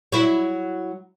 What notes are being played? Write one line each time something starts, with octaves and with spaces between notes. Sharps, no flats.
F#3 E4